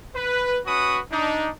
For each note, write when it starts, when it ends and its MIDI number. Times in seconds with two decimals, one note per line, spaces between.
0.16 0.60 71
0.66 1.00 61
0.66 1.00 66
0.66 1.00 71
0.66 1.00 83
0.66 1.00 85
0.66 1.00 87
1.11 1.49 62
1.11 1.49 63